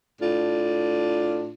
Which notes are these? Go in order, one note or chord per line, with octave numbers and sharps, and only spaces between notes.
A2 D4 F4